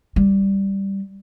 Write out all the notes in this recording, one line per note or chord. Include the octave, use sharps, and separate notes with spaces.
G3